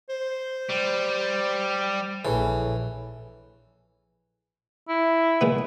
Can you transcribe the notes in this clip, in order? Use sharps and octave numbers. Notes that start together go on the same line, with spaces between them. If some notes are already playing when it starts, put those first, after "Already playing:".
C5
G3
A#1 E3 G#4 A4 C#5
E4
A#2 G#3 B3